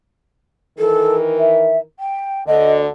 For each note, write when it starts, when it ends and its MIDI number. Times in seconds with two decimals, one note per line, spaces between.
0.78 1.82 51
0.78 1.82 52
0.78 1.15 69
0.78 1.82 70
1.38 1.77 76
1.99 2.42 79
2.47 2.88 38
2.47 2.88 50
2.47 2.76 75